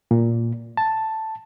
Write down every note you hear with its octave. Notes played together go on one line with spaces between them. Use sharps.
A#2
A5